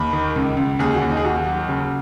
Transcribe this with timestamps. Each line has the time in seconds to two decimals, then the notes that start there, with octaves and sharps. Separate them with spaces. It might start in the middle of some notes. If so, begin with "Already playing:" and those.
Already playing: D#2 B5
0.13 D#3
0.36 C#2
0.57 C#2
0.79 D#2 G#4
0.94 F#4
1.01 D#2
1.10 D#4
1.17 G#4
1.24 D#2 F#4
1.46 F#3
1.68 C#3